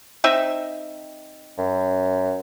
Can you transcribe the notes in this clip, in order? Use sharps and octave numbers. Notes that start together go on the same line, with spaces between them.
C4 D#4 E5
F#2